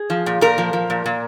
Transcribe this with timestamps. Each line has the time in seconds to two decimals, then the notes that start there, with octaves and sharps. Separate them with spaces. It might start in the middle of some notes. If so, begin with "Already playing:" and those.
Already playing: G#4
0.10 F3
0.26 A#2
0.41 A#2 A#4
0.58 F3
0.73 F3
0.90 A#2
1.06 A#2